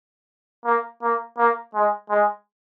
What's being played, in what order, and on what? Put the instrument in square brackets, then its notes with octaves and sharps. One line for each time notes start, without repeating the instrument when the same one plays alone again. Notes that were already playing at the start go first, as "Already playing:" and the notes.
[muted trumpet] A#3
A#3
A#3
G#3
G#3